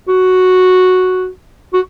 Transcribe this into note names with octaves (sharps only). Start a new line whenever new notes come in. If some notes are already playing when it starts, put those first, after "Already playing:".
F#4
F#4